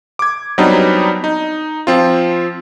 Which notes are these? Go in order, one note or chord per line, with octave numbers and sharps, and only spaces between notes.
D6 G#6
F#3 G3 B3 C4 D4 D#4
D#4
F3 C4 F4